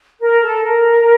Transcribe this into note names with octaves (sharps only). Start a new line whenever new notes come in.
A#4
A4
A#4